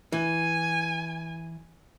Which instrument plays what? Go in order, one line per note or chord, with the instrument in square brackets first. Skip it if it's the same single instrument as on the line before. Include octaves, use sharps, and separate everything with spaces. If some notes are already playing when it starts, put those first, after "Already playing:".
[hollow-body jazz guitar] E3 [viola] G#5